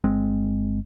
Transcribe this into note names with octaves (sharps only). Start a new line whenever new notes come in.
G1 G#3 C4